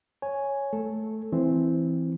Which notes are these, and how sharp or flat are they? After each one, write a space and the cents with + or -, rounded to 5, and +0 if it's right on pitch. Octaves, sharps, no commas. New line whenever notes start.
C#5 +0 G#5 +0
A3 -15 A4 +0
E3 +0 C4 -5